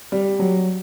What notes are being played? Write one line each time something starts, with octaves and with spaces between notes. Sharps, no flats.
G3
F#3